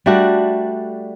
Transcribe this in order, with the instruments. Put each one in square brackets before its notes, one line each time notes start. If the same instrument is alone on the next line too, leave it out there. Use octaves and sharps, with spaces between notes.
[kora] G3 A3 D4 F#4